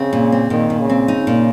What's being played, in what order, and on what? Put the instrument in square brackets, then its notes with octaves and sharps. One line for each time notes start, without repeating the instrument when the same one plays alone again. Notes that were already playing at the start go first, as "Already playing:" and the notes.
Already playing: [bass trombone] C#3 [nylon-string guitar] C4
[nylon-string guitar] A#2
C4
[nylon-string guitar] A#2 [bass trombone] D#3
[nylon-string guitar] A#2
[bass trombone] C#3
[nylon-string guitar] C4
D#4
A#2